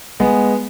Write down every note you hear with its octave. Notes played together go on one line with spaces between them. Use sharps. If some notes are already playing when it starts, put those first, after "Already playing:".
G#3 B3